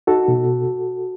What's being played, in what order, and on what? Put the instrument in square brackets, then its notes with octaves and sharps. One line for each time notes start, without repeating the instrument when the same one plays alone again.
[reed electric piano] D#4 F#4 A4
B2